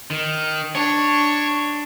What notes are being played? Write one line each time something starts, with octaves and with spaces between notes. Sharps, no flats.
D#3
D4 C#5